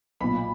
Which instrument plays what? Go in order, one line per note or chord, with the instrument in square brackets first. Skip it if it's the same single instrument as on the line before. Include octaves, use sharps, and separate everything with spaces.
[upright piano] B1 A#2 B5